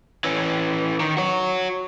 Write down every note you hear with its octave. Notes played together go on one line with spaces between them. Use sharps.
E3 C#4
D#3
F#4 C#5